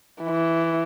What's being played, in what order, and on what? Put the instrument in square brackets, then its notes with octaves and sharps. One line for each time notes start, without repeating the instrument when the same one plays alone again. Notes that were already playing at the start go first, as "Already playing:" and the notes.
[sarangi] E3